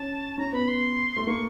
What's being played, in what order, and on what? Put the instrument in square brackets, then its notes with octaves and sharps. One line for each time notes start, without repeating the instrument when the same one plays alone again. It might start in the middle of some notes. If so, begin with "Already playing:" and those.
Already playing: [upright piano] C#4 [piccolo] A5
[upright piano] C#4 [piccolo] A#5
[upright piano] B3 [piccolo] B5
[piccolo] C6
[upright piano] A3
[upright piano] A#3 [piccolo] C#6